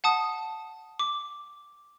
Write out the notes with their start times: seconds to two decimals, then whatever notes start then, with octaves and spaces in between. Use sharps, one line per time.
0.04 F#5 A5 D#6
0.99 D6